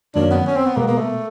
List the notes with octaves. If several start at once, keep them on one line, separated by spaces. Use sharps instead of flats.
F#2 D#3 F#3 A#3 C#4 D4
B3
C#4
C4
B3
B2 G#3 A#3 B3
A#3
A3